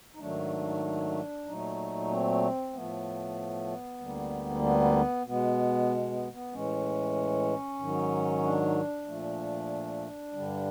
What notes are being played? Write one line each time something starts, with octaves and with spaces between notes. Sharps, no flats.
D#4
G#2 D#3 F#3 A3 D4
A#2 F#3 A3 D#4
C4
A2 F3 A3 B3
D2 D3 G3 A#3
B3
B2 G#3 B3
B3
B3
A2 E3 G#3 C#4
G#2 D#3 F#3
D4
A#2 F3 A3
G2 D3 G3